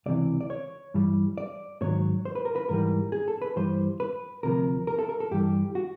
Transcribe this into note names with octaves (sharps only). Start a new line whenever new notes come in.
C#2 C3 E3 D5
D5
C#5
G2 E3 G3
D5
G#2 D#3 F#3 C#5
C5
B4
A#4
B4
G#2 E3 G3 A#4
G#4
A4
B4
G2 E3 G3 C5
B4
D2 C3 F3 A#4
A#4
A4
A#4
A4
G2 E3 G3 G4
F#4